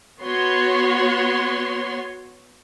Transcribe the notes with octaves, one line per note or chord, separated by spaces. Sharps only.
B3 F#4 C#5 C6